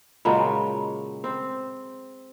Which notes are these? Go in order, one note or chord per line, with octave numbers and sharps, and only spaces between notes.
A#2 C#3 F#3 G#3
C4